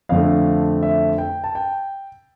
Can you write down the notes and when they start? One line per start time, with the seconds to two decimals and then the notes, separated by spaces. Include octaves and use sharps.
0.09 F2 D3 A3 F5
0.83 E5
1.18 G5
1.44 A5
1.55 G5